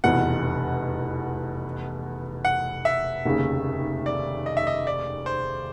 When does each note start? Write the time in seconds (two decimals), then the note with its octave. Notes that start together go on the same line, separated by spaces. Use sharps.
0.04 F1 E2 B2 F#5
2.45 F#5
2.85 E5
3.25 F1 D#2 C#3
4.06 D5
4.46 D#5
4.57 E5
4.67 D#5
4.87 D5
5.26 C5